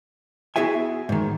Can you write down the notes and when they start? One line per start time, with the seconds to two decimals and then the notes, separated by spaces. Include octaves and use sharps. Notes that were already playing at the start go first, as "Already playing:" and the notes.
0.56 B3 E4 F#4 G#4 E5 G#5
1.09 G#2 D#3